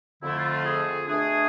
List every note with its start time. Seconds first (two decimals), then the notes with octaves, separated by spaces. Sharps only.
0.23 F2 D3 A3 E4
0.38 F4
0.51 F4
0.65 G#4
1.07 B2 A3 D4 G#4